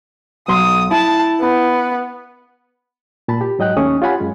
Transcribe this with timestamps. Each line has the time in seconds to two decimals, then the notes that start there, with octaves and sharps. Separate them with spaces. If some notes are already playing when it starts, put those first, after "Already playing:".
0.48 B1 F#3 C6 D#6
0.91 E4 A5
1.40 B3
3.28 A#2 A5 B5
3.41 G4
3.59 G#2 F#3 D#5 G5 F#6
3.77 D#2 A3 C#4 C#6 D#6
4.02 F4 G4 C#5 F#5 G#5 B5
4.20 F#2 G#3